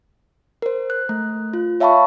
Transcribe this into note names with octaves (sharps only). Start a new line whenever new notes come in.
A#4 C5
F#6
A3
F4
C#5 E5 F5 A5 B5 C#6